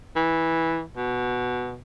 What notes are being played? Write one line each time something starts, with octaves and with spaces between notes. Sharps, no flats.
E3
B2